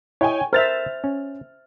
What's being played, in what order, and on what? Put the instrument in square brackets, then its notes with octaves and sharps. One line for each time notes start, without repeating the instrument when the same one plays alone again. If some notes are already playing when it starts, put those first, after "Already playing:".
[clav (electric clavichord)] E4 D#5 [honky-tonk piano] C#5 G5 G#5
[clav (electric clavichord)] A#4 [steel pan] C5 E5 [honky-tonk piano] F6 A6 F7
[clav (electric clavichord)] C#4